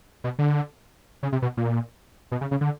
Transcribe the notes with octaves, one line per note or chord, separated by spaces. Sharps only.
B2
D3
C#3
C3
B2
A#2
B2
C#3
C#3
D3